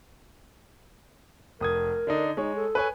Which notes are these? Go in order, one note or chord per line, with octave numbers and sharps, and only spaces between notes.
F1 A#4 D#6 G#6
D3 D4 D#4
G#3 D#4 C#5
A4
B4 C#5 G#5